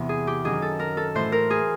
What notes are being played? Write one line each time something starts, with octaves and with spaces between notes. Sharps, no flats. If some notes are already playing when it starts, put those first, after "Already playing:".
Already playing: E2 C3 E3
G#4
G4
F#2 D#3 G#4
A4
A#4
A4
A2 E3 C5
A#4
G#4